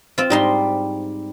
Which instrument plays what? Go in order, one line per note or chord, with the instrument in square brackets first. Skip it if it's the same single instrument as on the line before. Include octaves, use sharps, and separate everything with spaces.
[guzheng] C4 F4
[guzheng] G#2 D#4 C6 [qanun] G3